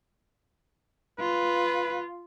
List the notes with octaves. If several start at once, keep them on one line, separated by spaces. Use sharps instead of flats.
F4 B4